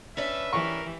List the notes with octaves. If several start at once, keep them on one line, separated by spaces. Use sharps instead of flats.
C#4 D4 B4 E5
E3 G4 A#4 C#6